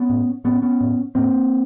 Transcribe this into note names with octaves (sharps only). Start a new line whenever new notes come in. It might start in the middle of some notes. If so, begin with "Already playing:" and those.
Already playing: B3 C#4
A2
A2 B3 C#4
B3 C#4
A2
A2 A#3 C4